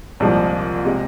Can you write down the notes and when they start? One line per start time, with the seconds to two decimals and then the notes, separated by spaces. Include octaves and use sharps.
0.20 C2 A#2 F3 G#3
0.85 C3 G#3